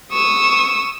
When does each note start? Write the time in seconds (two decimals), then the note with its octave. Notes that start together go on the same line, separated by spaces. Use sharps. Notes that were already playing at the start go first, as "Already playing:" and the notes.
0.12 C#6 D#6 E6